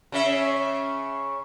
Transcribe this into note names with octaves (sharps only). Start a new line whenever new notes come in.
C#3 C#4 E5